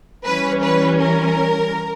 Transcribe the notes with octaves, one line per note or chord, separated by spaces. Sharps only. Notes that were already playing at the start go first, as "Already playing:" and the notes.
E3 G3 C#4 B4
B4
A#4